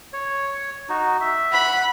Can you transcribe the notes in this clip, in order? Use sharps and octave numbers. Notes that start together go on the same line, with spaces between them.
C#5
D#4 F#4
E5
F#5 B5